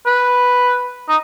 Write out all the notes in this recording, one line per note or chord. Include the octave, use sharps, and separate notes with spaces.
B4
D#4